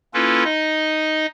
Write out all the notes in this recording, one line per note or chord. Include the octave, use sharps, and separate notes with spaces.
A#3 C#4 E4 F4 A4 B4
D#4 D#5